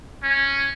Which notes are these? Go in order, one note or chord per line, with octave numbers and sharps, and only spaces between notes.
C#4